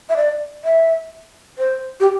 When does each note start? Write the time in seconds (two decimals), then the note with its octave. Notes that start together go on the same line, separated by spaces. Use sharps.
0.09 E5
0.16 D5
0.64 E5
1.58 C5
2.00 G4